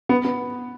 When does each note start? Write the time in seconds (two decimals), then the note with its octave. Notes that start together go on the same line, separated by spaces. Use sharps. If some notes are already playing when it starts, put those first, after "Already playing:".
0.09 B3
0.25 B3